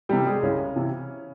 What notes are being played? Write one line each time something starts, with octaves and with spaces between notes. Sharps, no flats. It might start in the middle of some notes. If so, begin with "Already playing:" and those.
C3 E3 G3 G4
G#3 G#4
C2 C#3 C#4
C3 E3